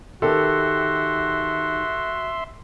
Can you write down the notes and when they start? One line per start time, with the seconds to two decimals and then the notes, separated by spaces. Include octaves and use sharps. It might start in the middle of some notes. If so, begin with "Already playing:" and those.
0.22 D#3 F#4 G4 A4 E5 C6